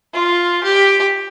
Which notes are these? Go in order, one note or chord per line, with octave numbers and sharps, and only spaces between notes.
F4
G4